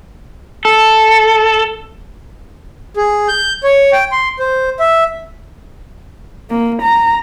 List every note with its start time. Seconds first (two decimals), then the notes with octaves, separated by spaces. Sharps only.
0.65 A4
2.96 G#4
3.28 G6
3.63 C#5
3.92 G5
4.12 C6
4.39 C5
4.80 E5
6.50 A#3
6.82 A#5